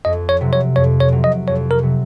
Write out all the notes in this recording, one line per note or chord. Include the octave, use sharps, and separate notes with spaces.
F2 D#5
C#5
C3 F#3
C#5
F2 C#5
C#5
C3 F#3
D#5
F2 C#5
A#4
C3 F#3